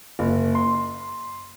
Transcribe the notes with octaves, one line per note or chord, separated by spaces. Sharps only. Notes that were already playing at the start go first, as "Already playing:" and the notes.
F#1
C6